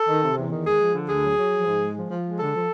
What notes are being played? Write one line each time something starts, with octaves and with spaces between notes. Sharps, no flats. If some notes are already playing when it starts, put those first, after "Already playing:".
Already playing: A4
D#3
C3
E2
D#3
G#3 G#4
F3
D3
D2 G#4
F#3
F#3
F3
G#2
G#3
F3
F3
G#3
D3 A4
F3